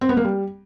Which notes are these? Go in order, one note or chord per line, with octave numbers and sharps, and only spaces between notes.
C4
B3
A#3
G3